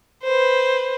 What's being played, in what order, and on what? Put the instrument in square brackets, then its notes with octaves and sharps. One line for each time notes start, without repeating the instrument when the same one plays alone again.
[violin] B4 C5